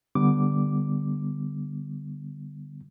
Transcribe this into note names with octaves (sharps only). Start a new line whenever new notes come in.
D3 G3 B3 D6